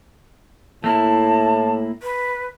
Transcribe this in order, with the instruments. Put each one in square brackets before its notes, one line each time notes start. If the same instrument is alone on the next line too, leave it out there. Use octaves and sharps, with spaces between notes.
[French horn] A2 [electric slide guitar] A3 A#3 E4 [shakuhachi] A5
[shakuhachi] B4